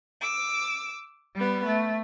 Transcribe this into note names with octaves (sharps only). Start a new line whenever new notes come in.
D6 E6
G3 B3
A3